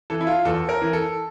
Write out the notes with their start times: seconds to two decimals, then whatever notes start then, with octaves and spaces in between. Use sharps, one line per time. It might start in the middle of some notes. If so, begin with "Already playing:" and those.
0.10 E3 A4
0.21 E4
0.27 F4
0.45 E2 A4
0.69 A#4
0.82 E3
0.93 A4